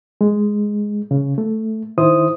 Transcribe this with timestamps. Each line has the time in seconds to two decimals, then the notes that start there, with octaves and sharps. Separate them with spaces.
0.21 G#3
1.11 C#3
1.38 A3
1.98 D#3 E4 C5 D#6